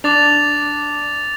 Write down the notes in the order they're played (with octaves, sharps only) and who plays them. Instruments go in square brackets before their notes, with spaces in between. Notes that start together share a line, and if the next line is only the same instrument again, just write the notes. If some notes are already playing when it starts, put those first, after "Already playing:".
[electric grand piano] D4 [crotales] D6 A6 F7